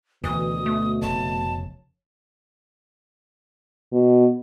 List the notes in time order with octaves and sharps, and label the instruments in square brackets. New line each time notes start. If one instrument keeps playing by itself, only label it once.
[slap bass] D2 [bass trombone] B2 [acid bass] E3 [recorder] D#6
[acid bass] A3
[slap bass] F1 C#3 [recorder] A5
[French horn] B2